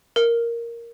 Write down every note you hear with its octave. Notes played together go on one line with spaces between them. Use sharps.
A#4